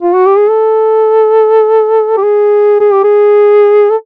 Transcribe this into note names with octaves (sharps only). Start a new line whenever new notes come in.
F4
F#4
G4
G#4
A4
G4
G#4
G#4
G4
G#4
A4